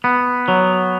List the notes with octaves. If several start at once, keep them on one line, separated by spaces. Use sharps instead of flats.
B3
F#3